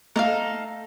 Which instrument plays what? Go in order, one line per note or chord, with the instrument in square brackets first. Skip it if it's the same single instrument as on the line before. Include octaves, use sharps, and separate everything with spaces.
[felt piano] A3 [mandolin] D#4 A4 F5